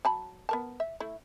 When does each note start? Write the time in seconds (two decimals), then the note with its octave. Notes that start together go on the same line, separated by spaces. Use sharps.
0.05 F#3 A5 B5
0.49 B3 A#4 A5
0.80 E5
1.00 A3 E4